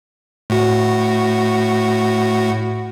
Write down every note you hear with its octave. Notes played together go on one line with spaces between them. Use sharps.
A2 F#4